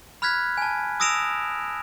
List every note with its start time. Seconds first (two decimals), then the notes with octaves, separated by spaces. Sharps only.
0.22 B5 F6 F#6 G#6 B6
0.58 G#5 A5
1.00 D#6 E6 A#6 D7 E7 F7